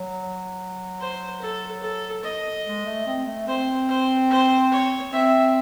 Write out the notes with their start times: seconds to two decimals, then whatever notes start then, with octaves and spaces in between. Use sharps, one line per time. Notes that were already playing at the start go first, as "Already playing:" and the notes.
Already playing: F#3
1.00 C5
1.42 A4
1.83 A4
2.24 D#5
2.65 G#3
2.86 A3
3.06 C4
3.27 A3
3.48 C4 C5
3.89 C5
4.30 C5
4.72 C#5
5.13 C4 E5